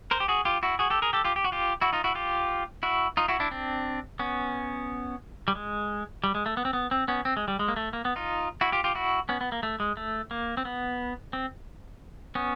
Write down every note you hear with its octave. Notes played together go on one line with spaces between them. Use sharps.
A#4 C5
G4
F#4 G#4
F4 G4
E4 F#4
F#4 G#4
G4 A4
G#4 A#4
G4 A4
F4 G4
G4
F#4
F4 G4
E4 F#4
D#4 F4
E4 F#4
F4 G4
E4 F#4
D#4 F4
E4 F#4
D4 E4
C4 D4
B3 C#4
G3
G#3
G3
G#3
A3
B3
C4
B3
C4
B3 C#4
C4
G#3
G3
G#3
A#3
A3
A#3
B3
D#4 F4
E4 F#4
F4 G4
F4 G4
E4 F#4
B3 C#4
B3
A#3
A3
G#3
A3
A#3
C4
B3
C4
B3 C#4